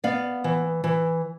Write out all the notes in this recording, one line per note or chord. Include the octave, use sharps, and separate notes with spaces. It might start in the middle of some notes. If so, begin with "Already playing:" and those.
B3 D5 F5
E3
E3